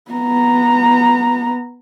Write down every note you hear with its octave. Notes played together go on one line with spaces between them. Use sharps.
B3 A#5